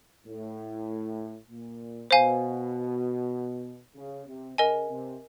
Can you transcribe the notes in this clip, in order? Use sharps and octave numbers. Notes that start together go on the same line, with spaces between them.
A2
A#2
B2 C5 F5 G#5
C#3
C3
C#3 A#4 D#5 G#5
C3